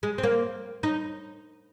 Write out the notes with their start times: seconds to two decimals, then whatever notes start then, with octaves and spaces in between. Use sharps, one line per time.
0.03 G#3
0.18 C4
0.23 A#3
0.83 D#4